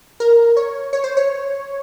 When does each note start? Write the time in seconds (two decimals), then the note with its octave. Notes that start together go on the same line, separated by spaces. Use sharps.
0.20 A#4
0.57 C#5
0.93 C#5
1.04 C5
1.17 C#5